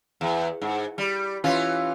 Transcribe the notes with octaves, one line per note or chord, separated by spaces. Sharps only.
E2
G#2
G3
E3 C#4 F4